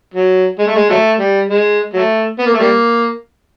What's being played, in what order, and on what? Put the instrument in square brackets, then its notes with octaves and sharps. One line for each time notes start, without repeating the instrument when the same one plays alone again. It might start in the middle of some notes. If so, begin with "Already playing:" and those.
[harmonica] F#3
G#3
A3
G#3
F#3 A3
G3
G#3
F#3 A3
B3
A#3
A3
G3 A#3